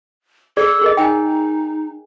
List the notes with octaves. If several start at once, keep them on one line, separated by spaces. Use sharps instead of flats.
G#4 A4 D5
G#4 A#4 D#5
D#4 G5 G#5